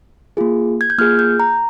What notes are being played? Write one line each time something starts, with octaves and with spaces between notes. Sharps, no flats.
A#3 F4 G#4
G#6
G6
A#3 F4 G#4 F6
G6
A#5